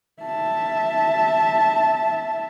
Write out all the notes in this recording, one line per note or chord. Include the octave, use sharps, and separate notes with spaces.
E5 A5